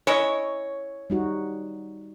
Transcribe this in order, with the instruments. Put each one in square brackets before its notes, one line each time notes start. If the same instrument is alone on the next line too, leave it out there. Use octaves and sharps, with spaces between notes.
[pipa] C#4 E4 D#5 [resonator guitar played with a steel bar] C#5
[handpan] G3 D#4 F#4